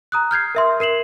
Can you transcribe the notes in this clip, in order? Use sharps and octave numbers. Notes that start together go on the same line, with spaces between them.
A#5 D#6 F#6
F6 G6 G#6 C7
A#4 E5 C6
A#4 C7 E7 F#7